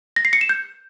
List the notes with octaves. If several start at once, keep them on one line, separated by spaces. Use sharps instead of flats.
A#6
C7
C#7
E7
G6